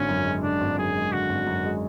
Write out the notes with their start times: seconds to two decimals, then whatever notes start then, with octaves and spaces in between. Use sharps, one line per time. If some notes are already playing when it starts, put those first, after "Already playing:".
Already playing: G#1 D3 C#4
0.09 F#2
0.26 G#3
0.43 D3 D4
0.61 G#1
0.78 F#2 G#4
0.96 G#3
1.12 D3 F#4
1.30 G#1
1.47 F#2
1.65 G#3